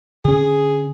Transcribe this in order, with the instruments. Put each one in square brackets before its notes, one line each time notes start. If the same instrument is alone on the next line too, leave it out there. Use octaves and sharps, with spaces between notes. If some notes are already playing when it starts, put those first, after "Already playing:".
[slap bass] D3 C#4 [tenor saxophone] G#4